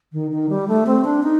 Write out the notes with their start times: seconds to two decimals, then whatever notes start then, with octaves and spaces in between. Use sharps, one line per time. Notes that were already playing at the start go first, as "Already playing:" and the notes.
0.13 D#3
0.31 D#3
0.49 G3
0.68 A3
0.86 C4
1.04 D4
1.23 D#4